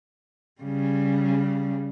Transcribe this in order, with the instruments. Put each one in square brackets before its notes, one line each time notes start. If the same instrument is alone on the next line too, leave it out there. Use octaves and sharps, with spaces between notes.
[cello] C#3 G3